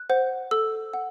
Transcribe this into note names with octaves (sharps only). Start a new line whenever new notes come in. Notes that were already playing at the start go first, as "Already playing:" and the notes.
Already playing: F#6
C5 F#5
A4 E6
F#5